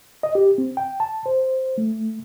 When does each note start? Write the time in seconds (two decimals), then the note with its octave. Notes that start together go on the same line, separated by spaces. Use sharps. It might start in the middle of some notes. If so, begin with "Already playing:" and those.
0.23 D#5
0.35 G4
0.58 C4
0.77 G5
1.00 A5
1.26 C5
1.78 A3